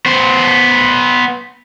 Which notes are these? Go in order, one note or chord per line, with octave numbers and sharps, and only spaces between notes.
B3 C5